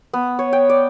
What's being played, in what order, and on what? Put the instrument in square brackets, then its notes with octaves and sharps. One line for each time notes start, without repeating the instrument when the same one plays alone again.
[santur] B3
C#5
G5
D5